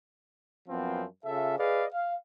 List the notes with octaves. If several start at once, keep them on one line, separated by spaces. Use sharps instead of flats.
F#2 F3 B3 C4
C#3 F4 A4 E5
G#4 B4 D5 D#5 F5
F5